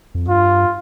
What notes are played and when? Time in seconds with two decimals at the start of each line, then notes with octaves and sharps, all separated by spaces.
0.15 F2
0.28 G2 F4